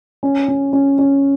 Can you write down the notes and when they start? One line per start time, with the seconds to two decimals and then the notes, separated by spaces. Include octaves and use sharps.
0.23 C#4
0.48 C#4
0.73 C#4
0.99 C#4